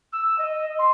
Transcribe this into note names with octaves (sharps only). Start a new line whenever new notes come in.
E6
D#5
C6